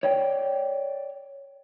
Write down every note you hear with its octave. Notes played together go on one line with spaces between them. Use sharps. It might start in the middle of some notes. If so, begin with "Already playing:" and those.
C#5 D5 G5